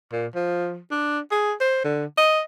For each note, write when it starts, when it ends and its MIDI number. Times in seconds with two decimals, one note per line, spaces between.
0.12 0.27 46
0.35 0.79 53
0.91 1.19 62
1.32 1.53 68
1.60 1.82 72
1.84 2.05 50
2.18 2.41 75